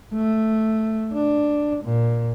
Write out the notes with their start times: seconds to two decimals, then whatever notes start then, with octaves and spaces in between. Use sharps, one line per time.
0.14 A3
1.13 D4
1.84 A#2